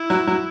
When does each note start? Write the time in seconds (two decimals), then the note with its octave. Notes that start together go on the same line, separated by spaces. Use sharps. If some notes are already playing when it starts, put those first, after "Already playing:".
Already playing: E4
0.10 F#3
0.27 F#3